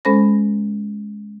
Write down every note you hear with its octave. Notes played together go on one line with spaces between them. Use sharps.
G#3 C#4 A4 C5 B5 A#6